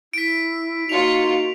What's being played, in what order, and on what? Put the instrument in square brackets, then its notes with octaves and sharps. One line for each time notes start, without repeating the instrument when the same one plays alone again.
[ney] E4 [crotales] B6 D7
[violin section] A#3 F4 C#7 [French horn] D#4 [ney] F#4 [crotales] F7